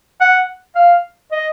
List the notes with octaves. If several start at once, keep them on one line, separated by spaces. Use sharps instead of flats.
F#5
F5
D#5